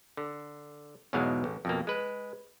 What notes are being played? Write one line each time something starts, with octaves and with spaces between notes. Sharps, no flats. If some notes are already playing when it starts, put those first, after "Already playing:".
D3
E2 G#2 B2 F#3 G#3 F5
A1
F2 B2 A#3
G#3 B4